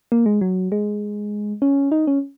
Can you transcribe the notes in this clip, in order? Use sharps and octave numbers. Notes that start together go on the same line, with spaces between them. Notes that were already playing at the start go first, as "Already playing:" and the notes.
A#3
G#3
F#3
G#3
C#4
D#4
C#4